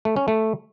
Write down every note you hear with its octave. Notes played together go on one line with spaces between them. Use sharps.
A3
C#4
A3